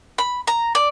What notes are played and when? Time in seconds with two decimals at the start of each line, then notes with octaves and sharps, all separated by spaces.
0.18 B5
0.47 A#5
0.75 D5